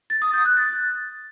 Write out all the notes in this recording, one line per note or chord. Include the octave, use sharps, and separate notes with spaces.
A6
D#6
G6
F#6
A6